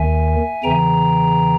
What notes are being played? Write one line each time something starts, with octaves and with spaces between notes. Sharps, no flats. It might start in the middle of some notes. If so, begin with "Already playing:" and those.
Already playing: D#2 D#3 E5 G#5
E2 C#3 E3 G5 A#5